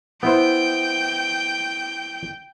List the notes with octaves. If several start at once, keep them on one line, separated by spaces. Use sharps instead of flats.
B3 E4 C5 G5